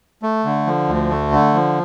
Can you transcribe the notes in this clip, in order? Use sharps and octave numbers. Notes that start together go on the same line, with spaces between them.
A3
D3
F3
D2
A3
D3
F3